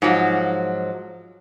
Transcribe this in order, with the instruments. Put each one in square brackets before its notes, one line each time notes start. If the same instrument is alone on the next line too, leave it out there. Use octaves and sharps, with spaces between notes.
[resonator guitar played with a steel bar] G#2 F3 F#3